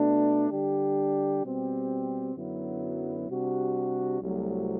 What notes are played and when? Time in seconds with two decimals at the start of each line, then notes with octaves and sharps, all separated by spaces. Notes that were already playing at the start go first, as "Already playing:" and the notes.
Already playing: B2 A3 D4
0.50 D3 G3 D4 G4
1.43 B2 G3 C4 G4
2.35 F#2 D3 F#3 B3 E4
3.27 C3 G3 D4 F#4
4.20 C2 C3 F#3 A3